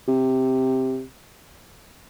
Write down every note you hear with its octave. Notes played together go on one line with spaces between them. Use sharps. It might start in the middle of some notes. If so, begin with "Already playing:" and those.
C3